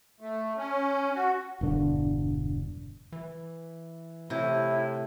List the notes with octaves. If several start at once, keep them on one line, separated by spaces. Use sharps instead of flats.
A3
C#4
F#4
E1 G2 D3
E3
A2 C3 E4